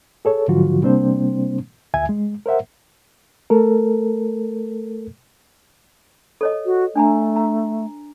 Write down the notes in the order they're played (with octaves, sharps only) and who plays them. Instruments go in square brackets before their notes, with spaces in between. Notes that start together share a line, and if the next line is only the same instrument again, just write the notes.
[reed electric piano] G#4 A4 C#5
G#2 D3 F3 F#3 F4 F#4
C3 G3 A#3 C4 D4 C5
D2 E5 G#5 G#6
G#3
A#4 C5 E5 F#5
A3 A4 A#4
[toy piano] A4 C#5 D#5
[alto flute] F#4
[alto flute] A3 [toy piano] D4 G#5 A#5
[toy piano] A#5